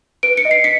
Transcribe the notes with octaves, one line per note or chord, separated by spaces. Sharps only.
B4 D7
C#7
D#5
C7
B6 C#7